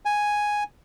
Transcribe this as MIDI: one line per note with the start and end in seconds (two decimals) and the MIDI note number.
0.05 0.63 80